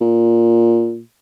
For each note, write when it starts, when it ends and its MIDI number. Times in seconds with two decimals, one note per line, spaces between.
0.01 1.01 46